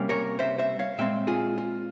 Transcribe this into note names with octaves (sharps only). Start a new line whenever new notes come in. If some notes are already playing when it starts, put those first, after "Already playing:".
Already playing: C3 G3 A#3 C#4
A#4 C#5
C5 E5
C5 E5
C#5 F5
A#2 G#3 C4 E5 G5
F4 G#4
F4